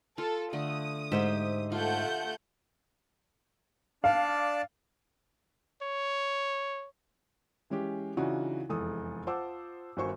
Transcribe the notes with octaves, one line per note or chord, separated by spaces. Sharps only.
F4 A4
D3 A3 D#6
G#2 G4 C5 E5
A3 F4 F#5 G6
D4 D5 F5 A5
C#5
E3 G#3 C#4 G4
C#3 E3 D4 D#4 F4 F#4
F1 E2 G#3 A4 D#6
F4 C5 F#5 A5 D6 E6
G1 D#3 F#4 C5 G#5 C#6